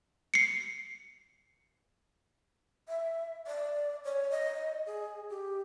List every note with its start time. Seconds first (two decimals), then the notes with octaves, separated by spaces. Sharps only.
0.34 C7 C#7
2.89 E5
3.47 D5
4.05 C#5
4.31 D#5
4.86 G#4
5.30 G4